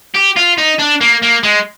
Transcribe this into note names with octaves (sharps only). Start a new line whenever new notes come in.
G4
F4
D#4
D4
A#3
A#3
G#3